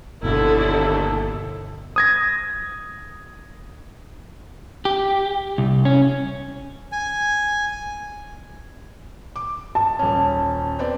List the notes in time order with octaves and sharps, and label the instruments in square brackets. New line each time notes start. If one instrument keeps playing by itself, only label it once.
[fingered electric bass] G1 B2 [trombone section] D#2 A4 [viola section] D3 E4
[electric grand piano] D#6 G#6 A#6
[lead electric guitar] G4
C2
C#4
[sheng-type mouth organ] G#5
[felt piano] D6
[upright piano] A5
[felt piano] D#1 C#4
B3 C4 D5